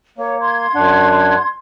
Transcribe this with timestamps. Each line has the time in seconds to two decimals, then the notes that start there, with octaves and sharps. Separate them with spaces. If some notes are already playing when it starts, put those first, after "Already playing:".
0.18 A#3 C#5
0.41 C6 G#6
0.75 F#2 D4 F#5